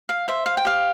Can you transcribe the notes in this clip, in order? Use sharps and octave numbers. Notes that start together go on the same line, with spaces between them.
F5
C5 E5
F5
G5
G4 F5